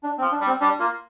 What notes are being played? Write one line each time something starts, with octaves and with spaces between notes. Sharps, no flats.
D4
C4
F3
D4
G3
C4
G3 D4
A#3 F4